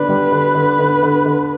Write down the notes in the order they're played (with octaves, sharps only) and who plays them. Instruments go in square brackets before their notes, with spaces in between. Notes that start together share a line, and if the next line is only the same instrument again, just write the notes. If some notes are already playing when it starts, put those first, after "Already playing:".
Already playing: [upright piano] D3 D4 [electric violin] B4
[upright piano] G3
D3
D3
D3
D3
D3